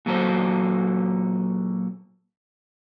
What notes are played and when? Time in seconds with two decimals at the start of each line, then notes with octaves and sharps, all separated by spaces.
0.06 A#2 F#3 A4 C5